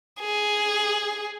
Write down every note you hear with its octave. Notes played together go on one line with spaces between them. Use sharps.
G#4